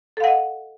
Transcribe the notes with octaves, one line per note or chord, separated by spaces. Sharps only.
A4 D#5 F5 F#5